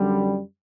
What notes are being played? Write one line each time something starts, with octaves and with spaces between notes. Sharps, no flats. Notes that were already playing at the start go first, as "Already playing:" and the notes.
Already playing: F#2 D3 G3